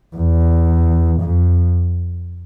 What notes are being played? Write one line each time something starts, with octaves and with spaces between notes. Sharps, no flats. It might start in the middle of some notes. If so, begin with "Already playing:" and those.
E2
F2